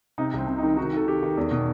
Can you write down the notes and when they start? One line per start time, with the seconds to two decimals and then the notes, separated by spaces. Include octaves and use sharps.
0.18 C3 D#4
0.34 C2 C4
0.47 C3
0.58 D#4
0.63 D#3
0.77 D#3 F#4
0.93 D#3 A4
1.07 D#3 G4
1.23 D#3
1.37 E2
1.51 B2